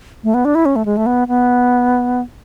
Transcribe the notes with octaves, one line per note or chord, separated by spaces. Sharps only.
A3
B3
D4
E4
C#4
A3
G#3
A3
B3
B3